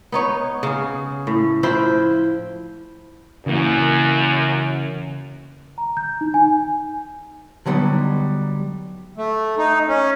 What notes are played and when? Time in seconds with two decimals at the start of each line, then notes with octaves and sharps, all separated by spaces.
0.12 B3 D#4 C#5
0.63 C#3 G#4
1.27 A2
1.63 F3 E4 C5 G5
3.46 F#2 C#3 E3 A#3
5.78 A#5
5.97 G6
6.21 D#4
6.34 G#5
7.66 D3 F#3 G3 B3 D#4
9.17 A3
9.58 D#4
9.88 C#4